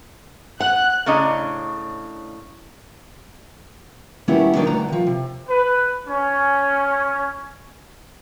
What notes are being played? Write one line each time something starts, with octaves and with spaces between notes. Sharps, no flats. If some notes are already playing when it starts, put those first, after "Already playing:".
F#5 F#6
A2 C#3 C#4 D4 D#5 A#5
D#3 F#3 G3 B3 C#4 E4
D3 D#3 F#3 D#4 A#4 D5
D2 G2 D3 F#4 A#5
D#3 F3
C3
B4
C#4